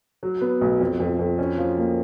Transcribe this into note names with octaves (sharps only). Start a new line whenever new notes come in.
F#3
B3
B1
F2
F2
F2
C#4
F3
A#3